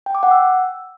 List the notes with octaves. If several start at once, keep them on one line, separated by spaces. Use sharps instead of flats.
G5
D6
F#5
E6